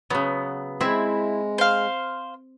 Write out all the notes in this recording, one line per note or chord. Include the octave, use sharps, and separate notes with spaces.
C#3 F#3 B3
G#3 C4 E4
C5 F5